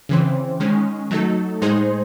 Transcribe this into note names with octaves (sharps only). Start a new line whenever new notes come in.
C#3 E3 C4
D#3 G#3 C#4
F#3 A3 D#4 A4
A2 G#3 D#4 G#4 C5